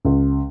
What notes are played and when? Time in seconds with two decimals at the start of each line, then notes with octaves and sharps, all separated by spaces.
0.05 C#2